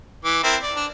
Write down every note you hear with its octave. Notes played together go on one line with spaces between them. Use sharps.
E3 D6
C4 E4 A#4
D5
D4